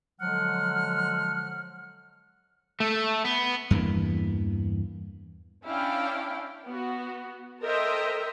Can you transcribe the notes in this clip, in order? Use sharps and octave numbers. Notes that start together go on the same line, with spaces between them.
D3 F3 F#3 G#3 F#5 F6
A3
B3
E2 G2 E3 A#3
C#4 D4 E4 F5 G5
B3 F#4
A4 A#4 C5 D#5 E5 G5